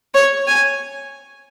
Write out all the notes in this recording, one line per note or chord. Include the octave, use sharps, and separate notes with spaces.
C#5
G#5